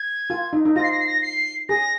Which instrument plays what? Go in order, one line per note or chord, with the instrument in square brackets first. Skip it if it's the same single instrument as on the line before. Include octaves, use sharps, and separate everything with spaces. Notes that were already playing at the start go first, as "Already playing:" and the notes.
Already playing: [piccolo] G#6
[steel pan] F4
D#4
D#4
[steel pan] F4 [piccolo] A#6
[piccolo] C7
A#6
C7
A#6
C7
[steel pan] G#4 [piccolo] A#6